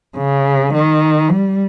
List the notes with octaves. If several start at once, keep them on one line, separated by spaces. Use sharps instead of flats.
C#3
D#3
G3